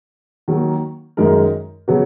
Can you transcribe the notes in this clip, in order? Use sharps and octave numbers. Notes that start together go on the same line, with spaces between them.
D#3 F#3 A#3
F#2 D#3 G#3 D#4 A#4
C#3 F#3 B3 F#4